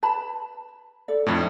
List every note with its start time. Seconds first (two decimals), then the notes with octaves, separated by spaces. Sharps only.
0.03 B4 A5 B5
1.08 A4 D5
1.26 F2 A2 D4 D#4 E5